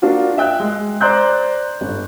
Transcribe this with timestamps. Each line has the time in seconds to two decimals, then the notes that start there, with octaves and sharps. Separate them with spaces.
0.02 A#3 D4 F4 F#4
0.38 E5 G5 F#6
0.60 G#3
1.01 C5 D5 A#5 C6 F#6 G6
1.81 G1